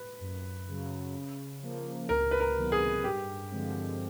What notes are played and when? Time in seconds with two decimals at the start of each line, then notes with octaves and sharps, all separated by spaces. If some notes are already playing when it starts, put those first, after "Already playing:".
Already playing: B4
0.20 F#2
0.68 C#3 F#3
1.15 C#3
1.62 F3 A#3
2.09 C#2 A#4
2.31 B4
2.40 A#4
2.56 C3 D#3 F#3 B3
2.72 G#4
3.04 G2 G4
3.51 D3 F3 G#3 C4